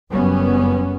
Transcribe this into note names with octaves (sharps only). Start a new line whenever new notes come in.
F#1 F#2 G3 B3 C#4